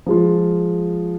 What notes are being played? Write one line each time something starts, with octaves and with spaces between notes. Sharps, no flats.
F3 G#3 F4